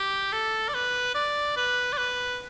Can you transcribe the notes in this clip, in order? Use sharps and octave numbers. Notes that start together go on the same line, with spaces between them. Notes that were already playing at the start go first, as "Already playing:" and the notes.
Already playing: G4
A4
D5
B4
D5
B4
D5
B4